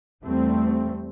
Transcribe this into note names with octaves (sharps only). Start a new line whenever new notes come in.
E2 G3 A3 C4